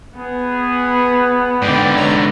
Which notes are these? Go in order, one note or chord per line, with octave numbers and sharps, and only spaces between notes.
B3 G#4 B4
G#2 B2 D3 D5 G5
C#5 A#5